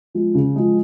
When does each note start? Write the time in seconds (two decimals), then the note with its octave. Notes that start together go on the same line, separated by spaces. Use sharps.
0.14 F3 G#3
0.35 C#3
0.56 F3 G#3